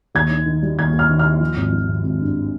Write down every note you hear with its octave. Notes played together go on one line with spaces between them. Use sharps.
D#2 G#6
D#3
D#3
G3
D#2 G#6
D#2
F6
D#3
F6
D#2
F3
G#1
F3
G#1
G#1
G2